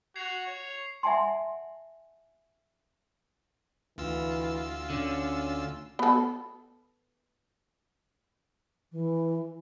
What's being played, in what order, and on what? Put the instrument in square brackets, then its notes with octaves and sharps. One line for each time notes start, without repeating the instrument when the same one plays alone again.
[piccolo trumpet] F#4 [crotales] G#6 C7 F7
[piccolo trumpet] C#5
[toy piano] E5 F#5 G#5 A5 C6
[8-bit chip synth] D2 F4 E6 [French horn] E3
[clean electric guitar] D3 [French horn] C#4
[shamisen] B3 A4
[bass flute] E3